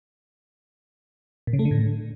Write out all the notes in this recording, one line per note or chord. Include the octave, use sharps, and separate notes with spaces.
A#2
C#3
A3
D3
A2